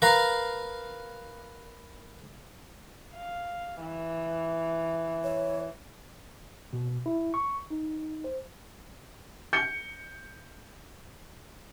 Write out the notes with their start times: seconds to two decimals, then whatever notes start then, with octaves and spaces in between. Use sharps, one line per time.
0.02 A#4 B4 F5 A#5
3.14 F5
3.81 E3
5.24 C#5
6.73 B2
7.06 E4
7.34 C#6
7.70 D#4
8.24 C5
9.53 G6 C#7